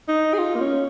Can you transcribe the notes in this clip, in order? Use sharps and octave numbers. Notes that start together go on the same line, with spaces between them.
D#4
G#4
F4
A#3
C#4